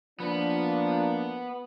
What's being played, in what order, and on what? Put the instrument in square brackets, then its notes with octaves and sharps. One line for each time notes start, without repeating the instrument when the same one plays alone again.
[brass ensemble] F3 A#3 D4 [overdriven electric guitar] B3